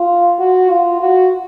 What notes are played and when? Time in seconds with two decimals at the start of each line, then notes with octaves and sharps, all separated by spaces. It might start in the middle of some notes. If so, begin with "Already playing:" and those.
Already playing: F4
0.39 F#4
0.70 F4
1.01 F#4